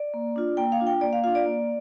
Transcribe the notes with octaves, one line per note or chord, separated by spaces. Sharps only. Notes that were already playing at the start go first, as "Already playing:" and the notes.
Already playing: D5
A#3
D4 F4
A#3 G5
F5
D4 F4
G5
A#3 D5
F5
D4 F4 F5
D5
A#3